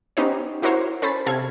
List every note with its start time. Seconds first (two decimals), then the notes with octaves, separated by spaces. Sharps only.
0.17 B3 C#4 D#4 G4 C5
0.62 E4 F#4 A#4 C5 C#5
1.02 C#4 A4 C5 B5 A6 B6
1.26 C3 A4 F5 G#6